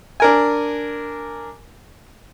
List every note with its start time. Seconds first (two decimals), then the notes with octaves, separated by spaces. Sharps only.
0.20 D4 A#4 G#5